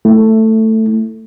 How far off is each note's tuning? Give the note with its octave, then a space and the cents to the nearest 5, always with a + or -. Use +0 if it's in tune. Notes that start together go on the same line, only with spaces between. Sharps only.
A3 +10 E4 +0